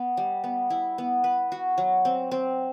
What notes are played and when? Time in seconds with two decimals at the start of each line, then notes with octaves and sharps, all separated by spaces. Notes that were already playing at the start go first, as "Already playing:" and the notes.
Already playing: B3
0.17 G3
0.44 B3
0.70 E4
0.98 B3
1.24 B4
1.52 F#4
1.78 F#3
2.05 C4
2.31 C4